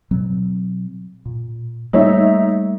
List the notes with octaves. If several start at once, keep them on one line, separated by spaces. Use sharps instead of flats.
B2 F#3 C4
A#2
G3 A3 A#3 D#4 C#5 E5